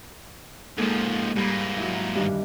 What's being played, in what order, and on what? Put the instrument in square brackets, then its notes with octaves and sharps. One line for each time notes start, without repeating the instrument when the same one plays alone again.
[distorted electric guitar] G#2 F3 [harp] G#3 A#3 A4
[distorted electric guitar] G#2 A#3 [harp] G3 A#5 B5
[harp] F#3 E4
G2 D#3 E3